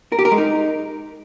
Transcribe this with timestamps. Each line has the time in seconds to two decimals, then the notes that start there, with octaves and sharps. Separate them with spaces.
0.12 A#4
0.19 G4
0.25 A#4
0.32 G#3
0.38 D#4